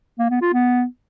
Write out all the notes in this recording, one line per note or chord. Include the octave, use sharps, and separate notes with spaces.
A#3
B3
F4
B3